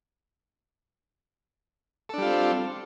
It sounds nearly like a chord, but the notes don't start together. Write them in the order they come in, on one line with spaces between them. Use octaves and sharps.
A4 D4 G3 F4 C4